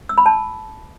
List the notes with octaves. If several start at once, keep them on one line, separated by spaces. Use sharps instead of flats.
E6
B5
A5